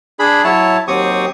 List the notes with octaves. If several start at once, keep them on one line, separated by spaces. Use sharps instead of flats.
D4 G#4 B5
F#3 E4 C#5 A5
D#2 F#3 C4 G4 C#6 D#6